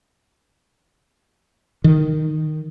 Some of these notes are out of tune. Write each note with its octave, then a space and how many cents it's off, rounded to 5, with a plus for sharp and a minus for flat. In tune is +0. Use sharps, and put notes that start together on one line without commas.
D#3 -10